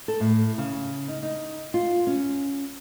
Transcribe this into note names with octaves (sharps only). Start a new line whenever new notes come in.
A4
A2
C#3
D#4
D#4
F4
C#4